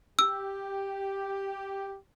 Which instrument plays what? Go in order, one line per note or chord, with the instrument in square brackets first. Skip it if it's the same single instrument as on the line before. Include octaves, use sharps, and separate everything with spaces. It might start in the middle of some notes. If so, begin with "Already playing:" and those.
[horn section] G4 [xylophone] E6